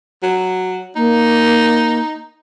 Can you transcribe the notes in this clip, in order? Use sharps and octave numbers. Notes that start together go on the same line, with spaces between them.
F#3
A#3 D#4